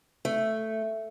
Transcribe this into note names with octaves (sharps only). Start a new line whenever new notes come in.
A3